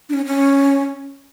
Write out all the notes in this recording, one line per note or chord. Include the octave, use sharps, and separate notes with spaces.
D4
C#4
C#4